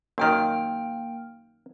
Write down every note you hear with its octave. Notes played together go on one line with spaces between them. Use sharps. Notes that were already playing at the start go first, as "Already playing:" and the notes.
F#2 D#3 A#3 G5 F6